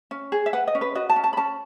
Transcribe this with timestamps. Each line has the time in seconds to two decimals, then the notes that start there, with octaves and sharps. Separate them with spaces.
0.11 C#4
0.32 G#4
0.46 E5
0.53 B4 F#5
0.67 D#5
0.75 C#4
0.81 B4
0.95 F#4 D#5
1.09 A5
1.16 C#4
1.24 A5
1.33 B5
1.37 C#4 A5